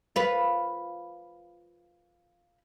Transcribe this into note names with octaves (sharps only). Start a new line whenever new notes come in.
F4 B4